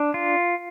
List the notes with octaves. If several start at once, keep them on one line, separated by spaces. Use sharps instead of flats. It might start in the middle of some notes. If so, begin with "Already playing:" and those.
Already playing: D4
F4